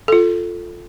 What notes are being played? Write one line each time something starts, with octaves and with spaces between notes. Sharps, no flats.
F4 A4